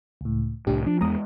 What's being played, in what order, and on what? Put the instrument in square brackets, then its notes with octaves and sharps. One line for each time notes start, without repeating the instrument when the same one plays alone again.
[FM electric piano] C#2 A2
[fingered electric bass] C2 A2 [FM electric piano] D4 G4
[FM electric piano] F3 [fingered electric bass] D4
[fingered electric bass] E2 G#3 B3 [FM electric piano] A#5 D#6